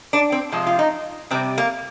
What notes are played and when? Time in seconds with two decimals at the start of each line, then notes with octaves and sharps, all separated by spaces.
0.13 D4
0.32 C4
0.52 C3 F3 G#3
0.67 F4
0.79 D#4
1.31 C3 G3 C4
1.58 A#3